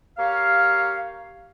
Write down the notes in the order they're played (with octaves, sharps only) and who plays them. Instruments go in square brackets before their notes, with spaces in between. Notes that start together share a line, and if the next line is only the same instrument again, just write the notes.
[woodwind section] A#3 G4 C#5 F5